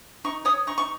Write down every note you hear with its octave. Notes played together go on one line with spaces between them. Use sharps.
D#4 C#6
C#5 D#6
D#4 C#6
C#6